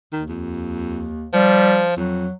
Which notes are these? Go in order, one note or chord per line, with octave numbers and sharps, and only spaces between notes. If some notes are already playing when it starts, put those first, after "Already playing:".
D#2 D#3
F2
F3 G3
F2 F#3